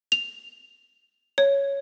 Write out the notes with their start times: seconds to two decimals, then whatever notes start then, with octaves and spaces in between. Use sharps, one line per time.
0.12 F7
1.38 C#5